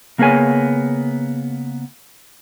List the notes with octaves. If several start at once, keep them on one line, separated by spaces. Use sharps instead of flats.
C#3 A#3 B3 G#4 C#5 G#5